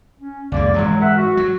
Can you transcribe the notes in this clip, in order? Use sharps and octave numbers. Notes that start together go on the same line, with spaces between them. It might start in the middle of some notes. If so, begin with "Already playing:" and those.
C#4
C#2 F#2 G#3 A#3 D5
G#2 E3 F#3 G#3
A#4 E5 F#5
F#4
F#3